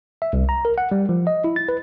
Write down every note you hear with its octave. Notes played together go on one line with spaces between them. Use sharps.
E5
C2
A#5
A#4
F#5
G3
F3
D#5
E4
A6
B4